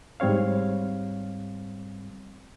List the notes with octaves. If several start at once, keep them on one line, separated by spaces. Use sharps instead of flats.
G#2 G3 C4 C#5 F5